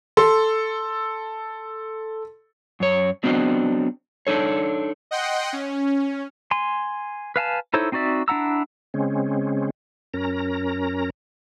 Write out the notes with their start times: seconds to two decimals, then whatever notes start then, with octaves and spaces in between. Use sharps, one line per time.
0.17 A4 C6
2.80 F#2 C#5
3.23 F#3 B3 C4 D4 F#4 D#5
4.27 D4 D#4 A4 C#5
5.11 D#5 F#5 G5 C6
5.53 C#4
6.51 G#5 C6
7.36 B4 F5 G#5 A5
7.74 D#4 E4 A4 C5 C#5
7.92 C4 D#4 F#4 D5 E5
8.28 D4 E4 F#5 A#5 E6
8.94 C#3 G#3 C4 C#4
10.14 F#2 C#4 A#4 A#5